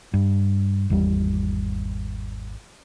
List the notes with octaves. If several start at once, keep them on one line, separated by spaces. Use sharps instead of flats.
G2
G#1 E2 G3